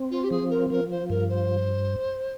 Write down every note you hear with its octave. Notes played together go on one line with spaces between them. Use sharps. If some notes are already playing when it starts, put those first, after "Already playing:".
Already playing: C4
F4
G4
F3 G#4
A#4
F3 A#4
C5
G2 A#4
C5